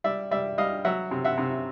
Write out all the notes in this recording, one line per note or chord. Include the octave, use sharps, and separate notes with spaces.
G3 D5 E5
G3 D5 E5
G3 D#5 F5
F#3 E5 F#5
C3
E5 F#5
C3